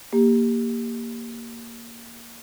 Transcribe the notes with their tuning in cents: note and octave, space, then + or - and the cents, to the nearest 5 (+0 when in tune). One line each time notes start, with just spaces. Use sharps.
A#3 +0 G4 +15